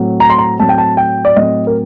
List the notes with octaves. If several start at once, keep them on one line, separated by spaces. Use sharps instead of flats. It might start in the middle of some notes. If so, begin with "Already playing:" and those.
Already playing: A2 F#3 C4
A#5
C6
A#5
A2 F#3 C4 A5
G5
A5
G5
D5
A2 F#3 C4 D#5
A#4